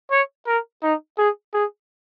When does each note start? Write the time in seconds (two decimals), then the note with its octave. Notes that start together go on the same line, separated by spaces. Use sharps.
0.11 C#5
0.47 A#4
0.83 D#4
1.18 G#4
1.54 G#4